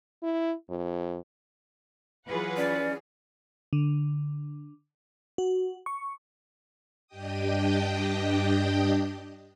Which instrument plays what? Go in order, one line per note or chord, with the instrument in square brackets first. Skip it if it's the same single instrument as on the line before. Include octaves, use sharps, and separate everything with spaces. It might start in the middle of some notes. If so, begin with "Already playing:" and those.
[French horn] E4
F2
[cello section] E3 F#3 G#4 [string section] F4 B4 F#5
[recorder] C#4 [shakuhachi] D5
[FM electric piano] D3
F#4
C#6
[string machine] G2 D4 G4 D#5 G5 D#6